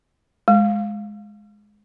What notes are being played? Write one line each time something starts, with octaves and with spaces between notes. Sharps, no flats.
G#3